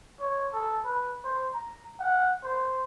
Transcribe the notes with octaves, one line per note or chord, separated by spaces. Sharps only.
C#5
A4
B4
C5
A#5
F#5
C5